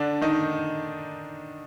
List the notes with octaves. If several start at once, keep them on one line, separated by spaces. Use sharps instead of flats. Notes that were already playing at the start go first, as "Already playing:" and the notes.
Already playing: D3 D4
D#3 D#4